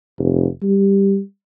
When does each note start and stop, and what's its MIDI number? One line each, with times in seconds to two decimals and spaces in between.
0.18 0.46 29
0.63 1.19 55